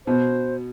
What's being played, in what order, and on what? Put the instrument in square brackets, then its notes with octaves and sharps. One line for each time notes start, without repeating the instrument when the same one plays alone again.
[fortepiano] B2 [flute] C5